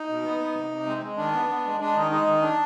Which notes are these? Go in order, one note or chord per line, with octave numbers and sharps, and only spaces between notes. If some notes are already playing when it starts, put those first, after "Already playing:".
Already playing: D#4
B2
B3
B3
C3
C3
G#3 C4
G#3
D#3 D4
B3
B3
G#3
G#3 D4
D#3 D#4
G#3 D#4
D#3
D4